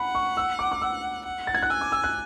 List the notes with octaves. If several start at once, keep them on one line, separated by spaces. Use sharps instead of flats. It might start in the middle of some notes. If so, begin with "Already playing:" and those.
Already playing: F#5 B5
C#6
E6
D6
D6
E6
F#5
A6
G#6
F#6
G#5 E6
D6
E6
F#6